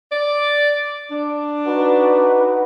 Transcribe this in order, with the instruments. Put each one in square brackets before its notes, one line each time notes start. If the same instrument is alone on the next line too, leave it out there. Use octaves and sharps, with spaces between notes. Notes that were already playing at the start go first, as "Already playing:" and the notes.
[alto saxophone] D5
D4
[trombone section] D#4 F#4 B4